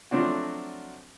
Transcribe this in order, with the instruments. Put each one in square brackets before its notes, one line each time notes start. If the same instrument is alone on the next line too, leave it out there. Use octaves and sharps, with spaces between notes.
[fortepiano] F3 F#3 A3 C4 D4 F#4